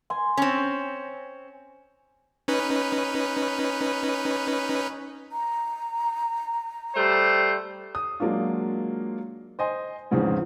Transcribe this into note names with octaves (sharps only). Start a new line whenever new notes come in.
G#5 C6
C4 C#4
C#4 D#4 B4
A#5
G3 A3 C5
D#6
F#3 G#3 A#3 D4 F4
C5 D#5 G#5 C6
E2 G#2 C#3 F3 C4